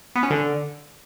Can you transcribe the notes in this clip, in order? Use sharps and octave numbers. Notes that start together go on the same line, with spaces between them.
B3
C#4
D3